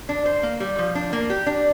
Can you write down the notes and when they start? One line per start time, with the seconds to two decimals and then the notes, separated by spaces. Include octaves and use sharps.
0.09 D4
0.26 C5
0.43 A#3
0.60 G3
0.78 F3
0.95 D4
1.13 A#3
1.30 G4
1.46 D4